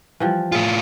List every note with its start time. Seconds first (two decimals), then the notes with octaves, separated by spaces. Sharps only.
0.20 E3 F3 G3
0.52 A2 F4 G#4 E5